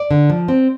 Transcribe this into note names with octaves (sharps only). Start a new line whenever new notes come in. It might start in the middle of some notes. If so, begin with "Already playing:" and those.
Already playing: D5
D3
F3
C4